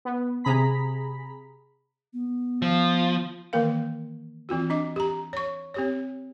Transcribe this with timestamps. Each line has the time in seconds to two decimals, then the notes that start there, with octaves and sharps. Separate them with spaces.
0.05 B3
0.44 C3 G#4 A#5 B5 B6
2.13 B3
2.62 F3
3.53 D#3 E3 A#3 A#4 F5
4.49 E3 C4 F4 F#4
4.70 D4 D#5 D6
4.96 G4 A#5
5.33 C#5 C#6
5.74 C4 G4 C#5